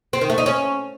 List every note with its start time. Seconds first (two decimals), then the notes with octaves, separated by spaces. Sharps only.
0.13 C4
0.21 D#3
0.30 A3
0.38 D#4
0.46 C#4